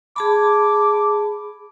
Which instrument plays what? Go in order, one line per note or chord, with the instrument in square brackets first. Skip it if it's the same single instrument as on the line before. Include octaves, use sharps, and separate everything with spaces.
[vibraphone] G#4 A5 B5 [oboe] D6